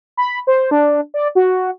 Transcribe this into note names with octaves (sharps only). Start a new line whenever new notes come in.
B5
C5
D4
D5
F#4